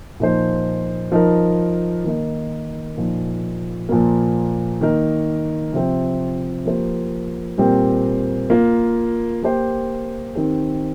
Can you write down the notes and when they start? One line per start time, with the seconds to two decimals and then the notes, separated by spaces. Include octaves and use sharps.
0.20 A#2 F3 D#4 C5
1.12 F3 D#4 A#4
2.04 D#3 A#3 D#4
2.97 A#2 F3 D#4
3.89 A#2 F3 A#3
4.81 D#3 A#3 D#4 A#4
5.73 C3 F3 C4
6.65 F3 A#3 G4 C5
7.58 A#2 G3 C4 G4 A#4
8.50 A#3 F4 A#4
9.43 A#3 G4 C5
10.35 D#3 C4 G4 A#4